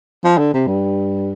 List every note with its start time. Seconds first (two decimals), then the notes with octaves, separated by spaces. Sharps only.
0.24 F3
0.38 D3
0.54 C3
0.67 G2